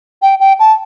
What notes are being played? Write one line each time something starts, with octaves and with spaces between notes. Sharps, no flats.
G5
G5
A5